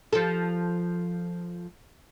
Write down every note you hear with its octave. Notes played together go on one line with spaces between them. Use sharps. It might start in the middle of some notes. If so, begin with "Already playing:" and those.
F3 A4